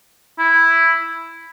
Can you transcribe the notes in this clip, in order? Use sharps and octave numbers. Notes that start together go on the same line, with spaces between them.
E4